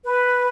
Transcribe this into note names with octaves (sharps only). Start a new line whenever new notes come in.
B4